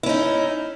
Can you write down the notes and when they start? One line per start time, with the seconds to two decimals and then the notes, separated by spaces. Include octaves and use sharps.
0.03 E4
0.06 C#4
0.09 D#4